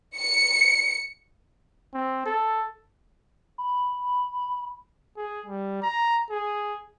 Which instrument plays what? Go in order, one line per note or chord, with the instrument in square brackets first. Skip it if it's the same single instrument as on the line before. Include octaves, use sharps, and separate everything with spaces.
[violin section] C#7
[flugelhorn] C4
A4
[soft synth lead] B5
[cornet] G#4
G3
A#5
G#4